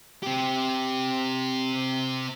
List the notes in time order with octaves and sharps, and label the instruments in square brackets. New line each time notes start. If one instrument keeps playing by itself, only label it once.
[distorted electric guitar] C4 G4